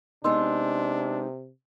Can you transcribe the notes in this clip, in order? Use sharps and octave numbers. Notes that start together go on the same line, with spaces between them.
C3 G#3 B3 D4 D#4 D#5 C6 E6